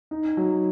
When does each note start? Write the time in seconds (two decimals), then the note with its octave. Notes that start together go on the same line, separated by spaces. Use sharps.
0.11 D#4
0.37 F#3